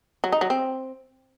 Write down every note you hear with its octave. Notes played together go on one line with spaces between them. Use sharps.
F#3
D#4
F#3
C4